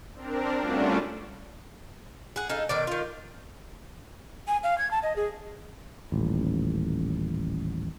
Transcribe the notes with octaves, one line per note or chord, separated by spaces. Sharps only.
C4 D4 A#4
G3 A3 C#4 D4 F4 F#4
G#4 F#5
D#4 G#4 A4 F5
B2 D#3 D5
D#3 F4
G#5
F5
G#6
A5
D#5
G#4
D#1 A1